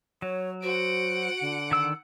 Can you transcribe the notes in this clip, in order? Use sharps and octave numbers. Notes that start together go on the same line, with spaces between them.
F#3 C#5
F#4 C5 F#5 D7
D3
D#3 E6